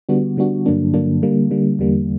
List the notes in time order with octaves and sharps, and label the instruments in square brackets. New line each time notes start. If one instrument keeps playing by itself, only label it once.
[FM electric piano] D3 G3 B3 D4 F#4
D3 G3 B3 D4 F#4
G2 D3 F#3 A#3 D4
G2 D3 F#3 A#3 D4
D3 G3 A#3
D3 G3 A#3
E2 D3 G3 A#3